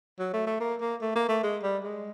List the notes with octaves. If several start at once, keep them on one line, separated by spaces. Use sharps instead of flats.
F#3
A3
A3
A#3
A#3
A3
A#3
A3
G#3
G3
G#3